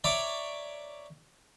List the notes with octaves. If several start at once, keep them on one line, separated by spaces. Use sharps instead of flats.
C#5 D5 E5 A#5 D6